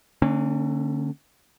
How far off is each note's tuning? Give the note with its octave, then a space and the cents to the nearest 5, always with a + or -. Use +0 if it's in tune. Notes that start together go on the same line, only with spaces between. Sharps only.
D3 +10 A#3 -45 C#4 -30